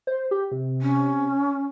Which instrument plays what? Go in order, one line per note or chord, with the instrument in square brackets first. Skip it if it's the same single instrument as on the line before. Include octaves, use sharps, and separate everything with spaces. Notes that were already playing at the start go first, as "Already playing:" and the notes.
[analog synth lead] C5
G4
C3
[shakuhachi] C#4